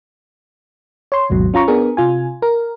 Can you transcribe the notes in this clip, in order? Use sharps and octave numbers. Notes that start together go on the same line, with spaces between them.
C#5 C6
G#1 D#2 G#2 B2 F#3
C#4 F4 A#5 C#6
B3 D4 G#4 A#4
C3 F4 G#5
A#4